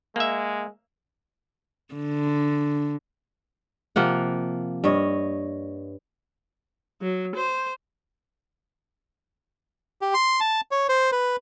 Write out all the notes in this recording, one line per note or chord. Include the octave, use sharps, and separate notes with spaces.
G#3 A#3 E5
D3
C3 F3 A#3 F#5
G2 C#5 D#5
F#3
C5
G4
C6
A5
C#5
C5
B4